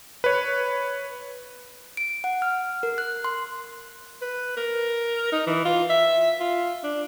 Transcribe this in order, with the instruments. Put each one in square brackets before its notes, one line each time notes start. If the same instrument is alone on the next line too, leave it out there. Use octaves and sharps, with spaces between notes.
[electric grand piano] B4 C#5
[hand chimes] D7
F#5
F6
A#4
F#6
C6
[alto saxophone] B4
A#4
D#4
E3
F4
E5
F4
D4